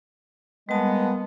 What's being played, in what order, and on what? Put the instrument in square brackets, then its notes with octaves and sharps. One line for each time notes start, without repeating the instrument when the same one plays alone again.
[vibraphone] G3 A5 [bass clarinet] G#3 [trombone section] A#3 B3